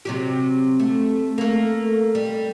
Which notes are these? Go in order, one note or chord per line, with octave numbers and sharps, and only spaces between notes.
C3 F#3 G4
A3
A3 A#3
G3